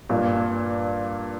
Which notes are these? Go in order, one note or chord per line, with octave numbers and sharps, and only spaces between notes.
G2 A#2